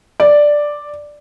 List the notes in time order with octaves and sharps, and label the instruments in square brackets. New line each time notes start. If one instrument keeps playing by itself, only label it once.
[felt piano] D5